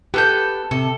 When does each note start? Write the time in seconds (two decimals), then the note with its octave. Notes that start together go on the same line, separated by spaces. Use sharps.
0.14 B3 G4 A4 G6
0.71 C3 A4